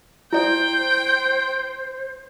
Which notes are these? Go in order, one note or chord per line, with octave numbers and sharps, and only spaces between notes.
E4 C5 D5 G5